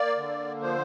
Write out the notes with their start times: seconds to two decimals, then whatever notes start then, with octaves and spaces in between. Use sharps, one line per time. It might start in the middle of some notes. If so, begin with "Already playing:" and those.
Already playing: A#3 D5
0.17 D3
0.61 F3 C5